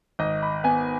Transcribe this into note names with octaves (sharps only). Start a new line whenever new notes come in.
G#1 D#5
B5
B3 G#5